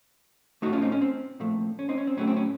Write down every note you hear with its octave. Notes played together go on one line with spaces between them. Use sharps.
A2 A3 D#4 F#4
C#4 F4
C4 D#4
C#4
C4
A#2 F3 A3
C#4
C4 D#4
C#4
C4
A2 F#3 A3 C#4
C4
C#4